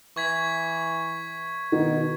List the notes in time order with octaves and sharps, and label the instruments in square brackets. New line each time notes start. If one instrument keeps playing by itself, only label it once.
[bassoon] E3 [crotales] C#6 G#6 B6
[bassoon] B2 [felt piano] D#3